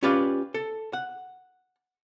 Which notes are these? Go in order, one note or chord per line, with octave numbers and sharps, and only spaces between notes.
C#4 F4 G4 B4 D5 F5
A4
F#5